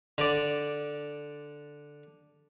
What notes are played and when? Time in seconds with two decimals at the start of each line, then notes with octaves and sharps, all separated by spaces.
0.18 D3 D5